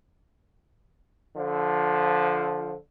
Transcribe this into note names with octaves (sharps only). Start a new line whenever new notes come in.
D3 F3